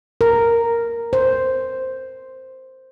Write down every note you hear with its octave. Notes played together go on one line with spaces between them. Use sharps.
A#4
C5